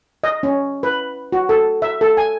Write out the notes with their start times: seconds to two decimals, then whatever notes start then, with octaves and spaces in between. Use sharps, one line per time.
0.24 D#5
0.43 C#4
0.83 B4
1.32 F#4
1.49 A4
1.82 E5
2.01 A4
2.17 G#5